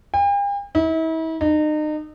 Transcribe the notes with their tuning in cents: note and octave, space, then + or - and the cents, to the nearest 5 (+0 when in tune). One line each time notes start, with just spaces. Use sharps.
G5 +45
E4 -40
D#4 -35